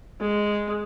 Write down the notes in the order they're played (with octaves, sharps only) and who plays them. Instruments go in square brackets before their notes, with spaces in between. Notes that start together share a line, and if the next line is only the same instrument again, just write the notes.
[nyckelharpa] G#3